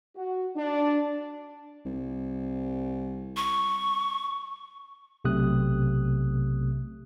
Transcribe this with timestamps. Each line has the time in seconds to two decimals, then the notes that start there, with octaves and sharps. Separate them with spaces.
0.16 F#4
0.56 D4
1.85 C2
3.37 C#6
5.24 B1 C3 A3 D#6 F#6